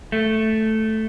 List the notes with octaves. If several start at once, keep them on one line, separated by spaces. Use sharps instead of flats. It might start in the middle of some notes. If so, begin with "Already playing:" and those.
A3